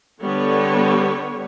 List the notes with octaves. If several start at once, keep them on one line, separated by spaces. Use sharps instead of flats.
D3 G3 B3 C#5